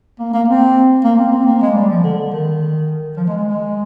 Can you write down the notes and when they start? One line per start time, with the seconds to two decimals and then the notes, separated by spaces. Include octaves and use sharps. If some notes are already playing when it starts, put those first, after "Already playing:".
0.19 A#3
0.33 A#3
0.48 C4
1.04 A#3
1.19 C4
1.32 C4
1.47 A#3
1.62 G#3
1.75 G3
1.89 F3
2.04 D3
2.18 D3
2.32 D#3
3.17 F3
3.27 G#3
3.38 G#3
3.49 G#3